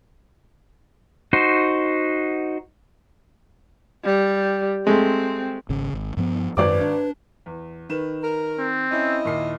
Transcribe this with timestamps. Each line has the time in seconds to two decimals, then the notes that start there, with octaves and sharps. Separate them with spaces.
1.33 D#4 F#4 C5
4.04 G3
4.87 G#3 A3 C4
5.69 G#1 C#3
5.93 G#1
6.17 G2 F3 B3
6.57 G#1 F#2 B4 D5 D6
6.81 D4
7.46 E2
7.89 D#3 B4 E7
8.23 A#4
8.58 C4
8.92 C#4 E4 D#5
9.25 D#2 A#2 C7